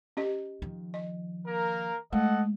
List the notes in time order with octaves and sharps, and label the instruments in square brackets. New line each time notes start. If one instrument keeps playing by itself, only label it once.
[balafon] C#4 G4 D#5
[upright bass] D#3 F3
[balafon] D#5
[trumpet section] A#3 A#4
[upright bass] G#3 [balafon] A3 [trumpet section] A4 D#5 F#5